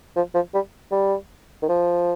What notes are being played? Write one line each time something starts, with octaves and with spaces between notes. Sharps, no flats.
F3
F3
G3
G3
D#3
F3